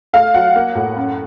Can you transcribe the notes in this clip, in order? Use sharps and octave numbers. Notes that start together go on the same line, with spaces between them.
A3 F5
F#3 F#5
A#3
A2
F#2